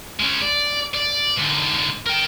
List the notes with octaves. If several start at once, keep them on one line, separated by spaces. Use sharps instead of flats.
G#3 C#4
D5
D5
G#2 D3
A#4 G5